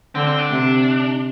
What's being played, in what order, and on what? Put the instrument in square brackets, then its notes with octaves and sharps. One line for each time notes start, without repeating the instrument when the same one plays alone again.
[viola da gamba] D3 [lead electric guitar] C4
[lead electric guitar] C4
D4
[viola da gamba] C3